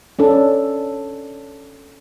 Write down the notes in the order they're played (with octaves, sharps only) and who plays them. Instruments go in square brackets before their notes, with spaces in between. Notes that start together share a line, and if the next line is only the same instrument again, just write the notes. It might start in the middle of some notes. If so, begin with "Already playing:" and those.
[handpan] C#4 D4 A4